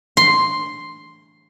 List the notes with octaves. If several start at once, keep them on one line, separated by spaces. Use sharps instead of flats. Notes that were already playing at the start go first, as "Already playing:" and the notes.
C6